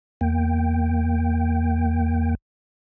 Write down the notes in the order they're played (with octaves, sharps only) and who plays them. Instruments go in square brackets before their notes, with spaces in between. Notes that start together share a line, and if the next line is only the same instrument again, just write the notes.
[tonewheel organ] E2 A#3 G5